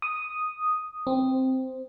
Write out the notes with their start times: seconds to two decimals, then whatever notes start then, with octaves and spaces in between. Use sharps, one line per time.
0.02 D#6
1.07 C4